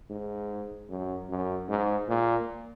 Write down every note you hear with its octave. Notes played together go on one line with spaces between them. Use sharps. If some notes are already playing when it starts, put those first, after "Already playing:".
G#2
F#2
F#2
G#2
A#2